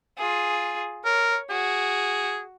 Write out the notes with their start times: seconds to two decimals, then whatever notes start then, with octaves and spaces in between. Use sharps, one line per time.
0.18 F4 G#4
1.05 A#4 C#5
1.50 F#4 G#4